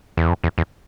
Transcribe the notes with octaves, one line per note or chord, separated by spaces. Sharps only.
E2
F2
E2
E2